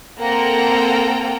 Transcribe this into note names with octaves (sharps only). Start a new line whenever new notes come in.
A#3 C4 A4 F#5 G5 A#5